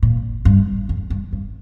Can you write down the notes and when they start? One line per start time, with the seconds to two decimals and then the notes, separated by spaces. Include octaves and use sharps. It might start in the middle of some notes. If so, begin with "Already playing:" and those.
0.03 A#2
0.45 G2
0.89 F2
1.10 G2
1.33 G2